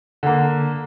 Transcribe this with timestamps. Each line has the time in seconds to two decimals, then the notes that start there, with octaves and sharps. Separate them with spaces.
0.23 D3 A#3